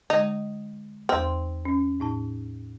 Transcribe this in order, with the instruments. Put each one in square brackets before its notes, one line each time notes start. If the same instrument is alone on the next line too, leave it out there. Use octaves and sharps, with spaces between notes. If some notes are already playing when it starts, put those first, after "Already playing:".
[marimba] D3 G#3 [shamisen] D#4
[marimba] E2 F6 [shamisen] C4
[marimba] C#4
A2 D#4 A5